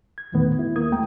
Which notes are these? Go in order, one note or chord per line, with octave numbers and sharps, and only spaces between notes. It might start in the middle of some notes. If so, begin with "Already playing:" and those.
G#6
E2 A#2 D#3 A3 B3
E4
D#2 A#3 D#6 G#6
A3 G5 A#5